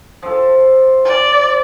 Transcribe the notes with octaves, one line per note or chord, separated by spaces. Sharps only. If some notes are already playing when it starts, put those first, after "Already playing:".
F3 A4
D5